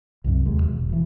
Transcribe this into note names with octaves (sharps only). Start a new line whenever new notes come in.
C2 F#2 C3
D#2 G#3 A#3
E1
E1 E3